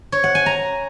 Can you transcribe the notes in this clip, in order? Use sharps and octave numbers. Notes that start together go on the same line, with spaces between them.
C#5
F#5
G#5
A#5